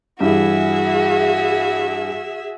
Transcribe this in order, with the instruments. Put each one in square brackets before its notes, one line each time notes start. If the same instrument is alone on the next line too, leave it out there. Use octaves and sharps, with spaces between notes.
[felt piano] G2 E3 [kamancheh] F#4 [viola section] G#4 E5